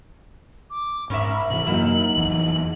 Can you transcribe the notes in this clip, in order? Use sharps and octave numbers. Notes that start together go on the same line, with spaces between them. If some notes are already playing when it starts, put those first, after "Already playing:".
D6
G#2 C#4 A#4 E5 B5
C3 E3 F#7
F#2 F#3 A#3 D#4 E4
A1 F2 E3